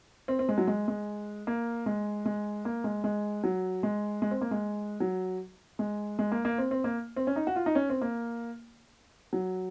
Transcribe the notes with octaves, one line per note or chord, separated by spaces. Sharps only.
C4
C4
G#3
F#3
G#3
G#3
A#3
G#3
G#3
A#3
G#3
G#3
F#3
G#3
G#3
C4
A#3
G#3
F#3
G#3
G#3
A#3
A#3
C4
C4
A#3
C4
C#4
D#4
F#4
F4
D#4
C#4
C4
A#3
F#3